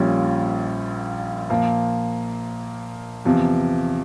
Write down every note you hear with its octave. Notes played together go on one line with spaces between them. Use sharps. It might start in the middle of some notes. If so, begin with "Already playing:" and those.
Already playing: A#1 A#2 G3 C#4 F4
A#2 F3 A#3
E2 C3 F3